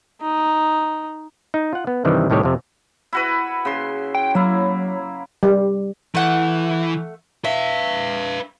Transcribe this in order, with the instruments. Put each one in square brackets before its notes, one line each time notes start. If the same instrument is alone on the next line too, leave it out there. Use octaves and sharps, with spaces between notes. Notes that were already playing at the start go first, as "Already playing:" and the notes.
[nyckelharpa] D#4
[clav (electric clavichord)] D#4
F4 F#5
B3
G2 C3 D#3 E3 G3
C2 A2 D#3 G4 C#5
F2 C3
[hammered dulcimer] E4 F#4 B4
C#3 C6
[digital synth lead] G5
[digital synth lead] F#3 [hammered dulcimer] A#3 E4
[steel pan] G3
[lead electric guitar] E3 [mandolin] A3 F#5
[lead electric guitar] B4 F5 [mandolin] E5